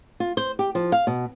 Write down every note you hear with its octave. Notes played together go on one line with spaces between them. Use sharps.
F4
C5
G4
F3
F5
B2